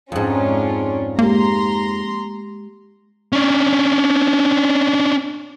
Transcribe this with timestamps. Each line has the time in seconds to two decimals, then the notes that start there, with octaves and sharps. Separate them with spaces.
0.12 F2 G#2 C#4 D4 F4
1.19 G#3 A#3 G4 A#5 C6
3.33 C#4 D4